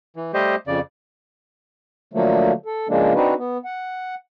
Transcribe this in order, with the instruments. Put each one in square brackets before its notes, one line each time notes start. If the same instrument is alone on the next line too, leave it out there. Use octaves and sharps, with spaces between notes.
[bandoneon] E3
G3 A3 G4 C5 D#5
F2 C#3 D5
[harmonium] D3 F3 F#3 A3 A#3
A4
C#3 F3 G#3 A#3 D4
C4 D4 D#4 F#4 B4
B3
F#5